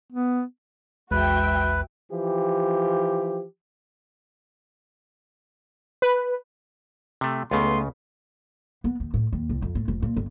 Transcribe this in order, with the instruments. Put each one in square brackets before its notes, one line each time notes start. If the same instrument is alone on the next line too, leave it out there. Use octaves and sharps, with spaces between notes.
[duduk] B3
[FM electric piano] A#1 E2 G#3 [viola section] F#4 E5 G5 [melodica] B4
[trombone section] E3 F3 G4
[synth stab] B4
[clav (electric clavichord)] C3 A3
[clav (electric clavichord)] C#2 C#3 [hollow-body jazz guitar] A3 B3 [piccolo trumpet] C6
[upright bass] B3
D#2
A2
D#2
C2
F2
A2
F1
A#2
G1